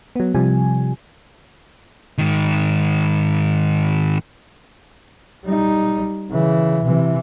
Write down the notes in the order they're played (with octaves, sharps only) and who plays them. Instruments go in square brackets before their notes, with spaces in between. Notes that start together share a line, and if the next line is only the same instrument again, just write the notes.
[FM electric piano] F#3 B3
C3 F3 G3 G#5
[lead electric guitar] G#2 D#3
[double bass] G3 D#4
C#3 E3
C3 E3